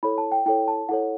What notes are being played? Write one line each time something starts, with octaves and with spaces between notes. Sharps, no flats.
E4 A4 C#5 B5
A5
G5
E4 A4 C#5 G5
A5
E4 A4 C#5 F#5